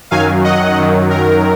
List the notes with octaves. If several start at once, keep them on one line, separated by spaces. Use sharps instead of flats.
F#2 D#3 F#3 F5 G#5
D#5 F#5
F#2 D#3 F#3
A#4